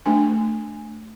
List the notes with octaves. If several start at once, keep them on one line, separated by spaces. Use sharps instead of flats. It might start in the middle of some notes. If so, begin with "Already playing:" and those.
A3 D4 G#5